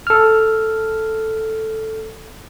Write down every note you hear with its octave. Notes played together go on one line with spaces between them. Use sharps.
A4 F6